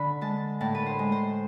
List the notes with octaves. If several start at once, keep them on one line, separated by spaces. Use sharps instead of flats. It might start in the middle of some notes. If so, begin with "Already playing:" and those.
Already playing: D3 B5
G#3 A5
A2 A5
B4
C5
G#3
C5